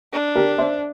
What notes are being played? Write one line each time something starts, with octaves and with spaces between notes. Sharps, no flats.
D4
G4 A#4
C5 E5